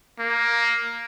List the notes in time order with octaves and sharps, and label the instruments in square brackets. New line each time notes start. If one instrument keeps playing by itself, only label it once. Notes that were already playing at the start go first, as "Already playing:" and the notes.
[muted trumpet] A#3